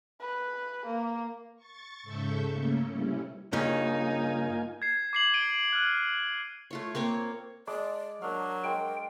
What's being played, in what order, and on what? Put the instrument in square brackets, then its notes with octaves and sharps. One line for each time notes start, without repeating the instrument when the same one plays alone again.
[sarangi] B4
A#3
[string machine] C#6 A6
G#2 C#3 A4 E5 C#6 G6
C#3 A3 A#3 C#4
C3 G3 C#4 E4
[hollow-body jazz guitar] G2 C#3 C#4 [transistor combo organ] A#3 F4 G#5 [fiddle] D#4
[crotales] G#6 C7
D6 C7 F#7
D7 D#7 G7
F6 F#6
[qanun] A3 F4 C#5
A#3 C4 C#5 D6
[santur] G#3 A5 D6 [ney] D5
[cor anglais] F#3 [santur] D4 F5 [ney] A#4
[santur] G#3 C5 [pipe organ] G5